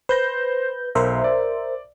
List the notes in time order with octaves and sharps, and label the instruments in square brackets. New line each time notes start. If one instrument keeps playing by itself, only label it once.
[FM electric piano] B4 G6 [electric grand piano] C5 A#6
[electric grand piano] B1 [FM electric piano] A#4 C5 E5
[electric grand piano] D5